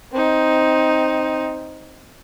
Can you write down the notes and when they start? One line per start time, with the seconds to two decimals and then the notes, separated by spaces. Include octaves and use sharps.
0.12 C4 D#4